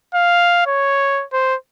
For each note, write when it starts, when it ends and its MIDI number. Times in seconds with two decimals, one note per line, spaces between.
0.14 0.63 77
0.67 1.24 73
1.33 1.55 72